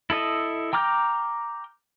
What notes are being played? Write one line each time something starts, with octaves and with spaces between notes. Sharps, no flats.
E4 A4 D#5
G5 A#5 D6 F6 G6